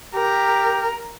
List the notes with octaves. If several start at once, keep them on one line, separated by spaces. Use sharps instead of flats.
G4 A#4